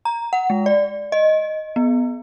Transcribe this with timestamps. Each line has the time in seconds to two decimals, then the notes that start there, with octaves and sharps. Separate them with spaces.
0.05 A#5
0.33 F#5
0.50 G#3
0.66 D5
1.12 D#5
1.76 B3